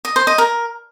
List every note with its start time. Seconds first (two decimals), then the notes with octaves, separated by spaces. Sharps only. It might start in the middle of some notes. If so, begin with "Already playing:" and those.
0.05 D#5
0.16 C5
0.27 D#5
0.38 A#4